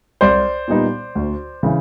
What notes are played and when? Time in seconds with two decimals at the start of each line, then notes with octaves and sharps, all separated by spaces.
0.21 C2 C5 D5
0.68 A#2 G3 B3 D#4
1.15 D2
1.63 C#3 E3